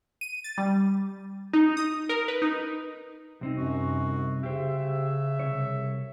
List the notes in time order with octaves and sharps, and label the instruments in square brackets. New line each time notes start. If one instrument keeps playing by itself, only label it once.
[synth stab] D#7
A6
G3
D#4
D#6
A#4
B4
D#4
[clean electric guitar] C2 C4 D#4
[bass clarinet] F#2 [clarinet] F#4
[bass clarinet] C#3 [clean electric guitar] G4 C5 [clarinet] E5
[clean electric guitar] C2 C#5